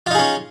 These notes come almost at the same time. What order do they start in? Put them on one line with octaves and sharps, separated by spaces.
F4 D#4 G#4 C#4